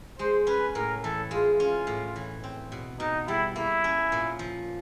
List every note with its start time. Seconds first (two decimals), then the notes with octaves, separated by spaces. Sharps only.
0.19 G#3 C5
0.47 C#4 B4
0.75 A2 A#4
1.03 E3 A4
1.31 G#3 F4
1.60 C#4 F4
1.87 A2
2.16 E3
2.44 C4
2.72 B2
3.00 B2 D#4
3.28 G3 E4
3.56 A#3 E4
3.84 C#4
4.12 A#2
4.39 F3